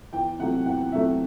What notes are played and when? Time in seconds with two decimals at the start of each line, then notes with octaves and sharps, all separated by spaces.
0.13 E2 G5
0.39 C3 F#3 A3 F#5
0.66 E2 F#5
0.92 C3 F#3 A3 E5